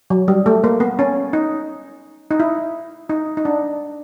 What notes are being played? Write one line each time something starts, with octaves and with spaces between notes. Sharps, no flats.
F#3
G3
A3
A#3
B3
C#4
D#4
D#4
E4
D#4
D#4
D4